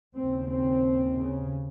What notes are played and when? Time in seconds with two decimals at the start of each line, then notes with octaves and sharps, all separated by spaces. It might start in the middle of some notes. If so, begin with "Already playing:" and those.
0.17 D#2 C#3 C4
0.49 C4
1.15 C#3